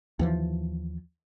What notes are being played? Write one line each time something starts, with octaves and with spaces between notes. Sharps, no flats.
D#2 E3 F3